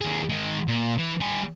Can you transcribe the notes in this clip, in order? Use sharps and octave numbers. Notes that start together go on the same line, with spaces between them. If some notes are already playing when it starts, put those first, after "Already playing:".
D#2 G#4
D#3 G#3
A#2
E3
G3 G#5